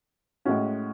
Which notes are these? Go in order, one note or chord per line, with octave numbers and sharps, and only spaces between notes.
A2 G#3 C#4 F#4